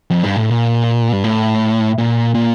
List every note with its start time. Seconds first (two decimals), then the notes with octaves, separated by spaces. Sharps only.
0.10 F2
0.23 G2
0.36 A2
0.50 A#2
1.13 G2
1.24 A2
1.98 A#2
2.35 A#2